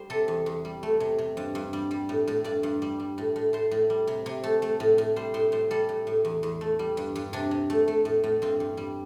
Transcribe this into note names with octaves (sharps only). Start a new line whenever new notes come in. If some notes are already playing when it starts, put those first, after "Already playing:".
Already playing: G3 C5
C3 A4
E2
E2
G3
A3
C3
C3
G2
G2
G3
G3
A2
A2
G2 D5
G2
G3
G3
A2
A2
A2 C5
A2
G3
C3
C3
A3
A3
A2
A2
G3 C5
A2 C5
A2 C5
G3 A4
A2
A2
E2
E2
A3
G3
G2
G2
C3 D4
C3
A3
A3
A2
A2
G2 C4
G2
G3